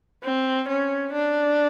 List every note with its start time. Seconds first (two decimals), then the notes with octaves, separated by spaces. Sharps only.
0.24 C4
0.69 C#4
1.13 D4